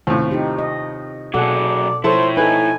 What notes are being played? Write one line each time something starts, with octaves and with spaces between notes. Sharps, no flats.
D#2 A2 C3 F4 C5
D#4 G4
D#5
B2 F#3 G#4 A4 D5 F#5
F3 E4 A4 C5 C#5
D#4 A4 B4 G#5